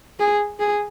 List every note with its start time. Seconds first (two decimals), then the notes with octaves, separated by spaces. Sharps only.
0.20 G#4
0.60 G#4